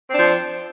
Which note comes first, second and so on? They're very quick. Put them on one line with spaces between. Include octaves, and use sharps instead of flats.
C4 D4 F3